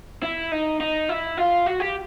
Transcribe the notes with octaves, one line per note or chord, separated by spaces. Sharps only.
E4
D#4
D#4
E4
F4
F#4
G4